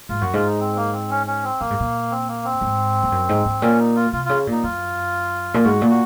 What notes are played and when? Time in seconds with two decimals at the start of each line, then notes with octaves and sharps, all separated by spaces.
0.09 G#2 F4
0.21 F#2 F#4
0.34 G#2 F4
0.47 D#4
0.60 C4
0.76 A#3
0.93 C4
1.10 C#4
1.27 C#4
1.44 C4
1.60 A#2 A#3
1.70 G#2
1.80 A#2
2.11 C4
2.28 A#3
2.44 C4
2.61 G#2
3.03 G#2
3.12 F#2
3.29 G#2
3.45 G#2
3.62 A#2 C#4
3.79 D#4
3.96 F4
4.13 C3 F4
4.25 C#3 F4
4.47 A#2 D#4
4.63 F#2 F4
5.54 A#2
5.64 G#2 F#4
5.81 A#2
5.90 F#4